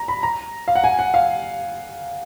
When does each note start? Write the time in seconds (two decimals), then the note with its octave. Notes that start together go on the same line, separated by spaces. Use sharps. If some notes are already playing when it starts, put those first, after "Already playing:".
Already playing: A#5
0.08 B5
0.23 A#5
0.68 F5
0.75 F#5
0.84 G#5
0.99 F#5
1.14 F5